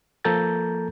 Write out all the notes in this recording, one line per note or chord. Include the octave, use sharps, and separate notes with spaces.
F3 A#3 A4 A#5 G6 A6